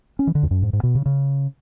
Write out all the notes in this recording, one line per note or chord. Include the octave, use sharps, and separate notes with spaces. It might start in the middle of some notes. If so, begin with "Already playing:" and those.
C#4
E3
D3
E2
F#2
G#2
G#2
B2
C#3
C#3